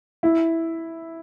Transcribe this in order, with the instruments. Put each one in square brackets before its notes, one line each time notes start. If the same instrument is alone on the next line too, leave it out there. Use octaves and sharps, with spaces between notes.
[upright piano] E4